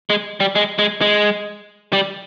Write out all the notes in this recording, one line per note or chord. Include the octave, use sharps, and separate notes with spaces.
G#3
G3
G#3
G#3
G#3
G3